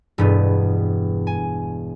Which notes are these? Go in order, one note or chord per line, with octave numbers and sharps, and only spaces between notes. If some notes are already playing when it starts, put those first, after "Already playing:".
E1 G2 B3
G#5